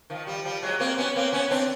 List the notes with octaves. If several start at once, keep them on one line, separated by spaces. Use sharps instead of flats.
D#3 F3
F3 G3
F3 G3
F#3 G#3
A#3 C4
B3 C#4
A#3 C4
B3 C#4
C4 D4